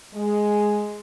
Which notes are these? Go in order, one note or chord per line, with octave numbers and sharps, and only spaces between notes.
G#3